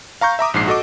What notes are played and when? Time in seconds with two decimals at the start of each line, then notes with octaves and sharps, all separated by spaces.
0.21 F5 A#5 C#6 G6
0.39 E5 A#5 D6 D#6
0.54 A#1 G#2 C7
0.67 F#4 A4 D#5 D6